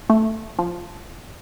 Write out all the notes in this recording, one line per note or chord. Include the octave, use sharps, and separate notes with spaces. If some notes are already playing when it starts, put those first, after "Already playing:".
A3
F3